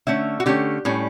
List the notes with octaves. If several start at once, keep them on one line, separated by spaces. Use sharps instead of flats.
D3 A3 C#4 E5
F#4
D3 A3 C#4 G4
A2 G3 C#4